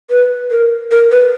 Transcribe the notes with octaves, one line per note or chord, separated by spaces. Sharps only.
B4
A#4
A#4
B4